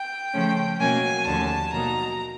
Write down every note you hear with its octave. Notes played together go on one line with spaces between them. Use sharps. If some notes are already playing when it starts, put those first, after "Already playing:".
Already playing: G5
C#3 F3 A3 C#4
B2 F#3 A#3 C#4 G#5
D#2 D3 F3 A3 C#4 A5
B2 F#3 A#3 D#4 A#5